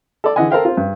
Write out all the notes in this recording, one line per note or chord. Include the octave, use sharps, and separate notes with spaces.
A4 D5
D3 E3 D#5 F#5 G#5
A4 A#4 C5 F5 G5
C4 F4
G2